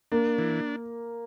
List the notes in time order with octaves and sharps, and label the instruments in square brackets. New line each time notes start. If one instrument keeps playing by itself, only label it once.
[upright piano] A#3 [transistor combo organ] D4
[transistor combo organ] E3